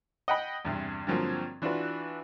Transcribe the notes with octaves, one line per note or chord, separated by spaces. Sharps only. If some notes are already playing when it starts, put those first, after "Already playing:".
D#5 F#5 G5 B5
E2 G2 C3
G2 D3 F3 F#3 A#3 C4
E3 D4 F4 F#4 B4